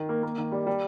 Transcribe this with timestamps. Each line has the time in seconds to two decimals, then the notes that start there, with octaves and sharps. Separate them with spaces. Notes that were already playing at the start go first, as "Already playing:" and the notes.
Already playing: D#3
0.09 A#3
0.23 A#3
0.38 D#3
0.52 G3
0.67 G3